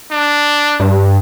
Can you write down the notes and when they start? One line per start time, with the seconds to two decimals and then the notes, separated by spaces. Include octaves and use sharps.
0.11 D4
0.80 G2